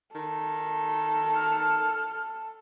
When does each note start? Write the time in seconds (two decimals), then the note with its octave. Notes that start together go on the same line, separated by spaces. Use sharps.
0.15 D#3 A4
1.34 F6